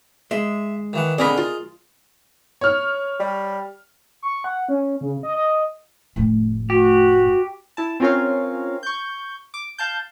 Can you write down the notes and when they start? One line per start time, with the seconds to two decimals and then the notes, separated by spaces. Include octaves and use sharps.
0.31 G#3 E5
0.93 D#3 E3 F#5
1.18 D3 C4 G#4 A#4 D#5 B5
1.37 F4
2.61 C#5 F6
3.20 G3
4.22 C#6
4.44 F#5
4.69 C#4
5.01 C#3
5.23 D#5
5.35 D#5
6.16 F1 A2
6.70 F#4 G4
7.77 E4 A5
8.00 C4 C#4 F4 A#4 C#5 F5
8.83 C#6 G6
9.54 D6
9.78 F5 A5 G6